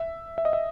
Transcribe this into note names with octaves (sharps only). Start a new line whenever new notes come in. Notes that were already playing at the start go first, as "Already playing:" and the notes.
Already playing: E5
E5
D#5
E5